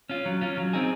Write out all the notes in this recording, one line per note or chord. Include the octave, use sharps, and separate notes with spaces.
C#4 F4
F#3
C#4 F4
F#3
C4 D#4 G#4